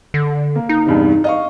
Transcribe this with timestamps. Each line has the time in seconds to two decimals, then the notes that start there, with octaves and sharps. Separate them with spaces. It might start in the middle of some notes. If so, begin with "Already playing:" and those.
0.14 D3
0.55 A#3
0.69 D#4
0.87 E2 G2 C3
1.24 D#5 F5 C#6